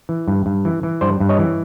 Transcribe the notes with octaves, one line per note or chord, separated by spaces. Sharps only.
E3
G2
G2
E3
E3
G2 C5 D5
G2
C#5 D#5
E3